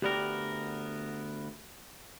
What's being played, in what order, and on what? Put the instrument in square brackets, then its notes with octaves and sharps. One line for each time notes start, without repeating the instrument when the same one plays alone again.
[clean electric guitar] D2 B3 A#4 [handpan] G4 D5